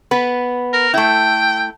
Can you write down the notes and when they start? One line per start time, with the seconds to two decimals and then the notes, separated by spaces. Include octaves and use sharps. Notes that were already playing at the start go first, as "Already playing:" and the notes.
0.11 B3 B4
0.73 A#4
0.94 A3 E4 G5